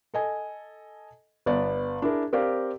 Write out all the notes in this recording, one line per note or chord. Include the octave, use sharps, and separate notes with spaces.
A4 D#5 G#5
G1 B3 D5
D4 E4 G#4 A#4
C4 G4 A#4 D5 F5